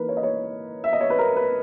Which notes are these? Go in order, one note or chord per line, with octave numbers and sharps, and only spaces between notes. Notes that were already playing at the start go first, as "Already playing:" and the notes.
Already playing: E3 A#3 D#4 A#4 B4
C#5
D#5
C#5
E5
D#5
C#5
B4
A#4
B4